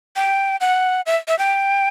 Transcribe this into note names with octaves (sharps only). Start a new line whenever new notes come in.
G5
F#5
E5
E5
G5